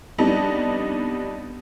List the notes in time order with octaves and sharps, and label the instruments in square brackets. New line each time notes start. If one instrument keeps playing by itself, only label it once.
[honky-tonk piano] F2 G3 B3 D4 D#4